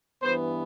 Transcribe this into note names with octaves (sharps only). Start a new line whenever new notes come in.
G2 E3 B3 C5